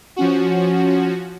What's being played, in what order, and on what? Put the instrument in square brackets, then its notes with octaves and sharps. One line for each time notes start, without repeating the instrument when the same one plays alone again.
[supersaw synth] F3 C#4 F#4